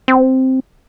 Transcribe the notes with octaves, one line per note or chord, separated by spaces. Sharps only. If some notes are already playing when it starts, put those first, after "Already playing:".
C4